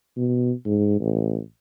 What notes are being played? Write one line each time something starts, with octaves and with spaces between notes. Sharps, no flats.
B2
G#2
A1